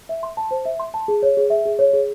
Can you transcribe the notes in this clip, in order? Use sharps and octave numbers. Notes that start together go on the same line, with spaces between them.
E5
C6
A5
C5
E5
C6
A5
G#4
C#5
G#4
E5
G#4
C#5
G#4